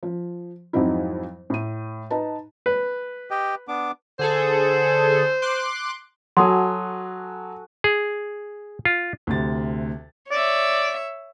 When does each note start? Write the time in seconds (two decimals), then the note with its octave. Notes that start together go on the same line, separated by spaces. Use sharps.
0.03 F3
0.73 F2 G#2 F#3 C4 D#4 E4
1.50 A2 D#7
2.10 D#4 B4 A5
2.66 B4
3.30 G4 D#5 G5
3.68 B3 D4 D6
4.19 D3 G#4 A4 C5
5.42 C6 D6 F#6
6.37 F#3 F#4 A4 G#5 C6 D#6
7.84 G#4
8.85 F4
9.27 D2 C3 A6
10.31 C#5 D5 E5